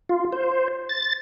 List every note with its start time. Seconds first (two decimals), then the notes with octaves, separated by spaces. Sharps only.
0.09 F4
0.32 C5
0.89 A6